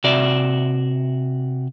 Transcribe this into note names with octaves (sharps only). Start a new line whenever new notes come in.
C3 F#4 D5 E5